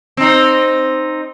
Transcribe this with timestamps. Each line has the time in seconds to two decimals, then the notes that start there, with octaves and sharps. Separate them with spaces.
0.17 C4 D#4